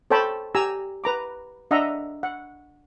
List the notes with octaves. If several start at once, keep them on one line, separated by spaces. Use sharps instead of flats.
A4 C5 C#5 G5 A5 B5
G4 G#5 A#5 E6
B4 A#5 D6
D4 D#5 E5 F#5 A#5
F#5